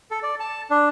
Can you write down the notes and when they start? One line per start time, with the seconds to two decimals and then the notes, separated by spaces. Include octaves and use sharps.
0.11 A4
0.23 D5
0.40 A5
0.70 D4